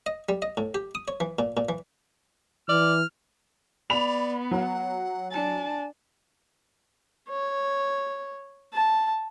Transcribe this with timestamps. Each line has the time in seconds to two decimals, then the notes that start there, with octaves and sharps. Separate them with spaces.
0.06 D#5
0.29 G3
0.42 D#5
0.57 A2
0.74 G4
0.95 D#6
1.08 C#5
1.20 E3
1.39 A#2
1.57 A#2
1.69 E3
2.69 E3 D5 F6
3.90 B3 D5 B5 F7
4.51 F#3 F#5
5.31 D4 G#5 A5
7.29 C#5
8.74 A5